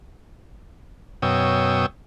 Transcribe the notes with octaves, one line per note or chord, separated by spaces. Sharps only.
F#2 B2 C#5 G5 D#6 E6